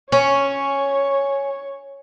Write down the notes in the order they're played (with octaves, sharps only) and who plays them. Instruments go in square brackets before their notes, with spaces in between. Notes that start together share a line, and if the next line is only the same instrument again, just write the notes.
[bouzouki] C#4 [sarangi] C#5